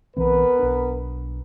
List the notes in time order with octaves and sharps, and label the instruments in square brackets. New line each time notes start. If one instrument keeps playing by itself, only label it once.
[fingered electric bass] B1 E3 C4 [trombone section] B3 A#4 B4
[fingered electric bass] B1 D4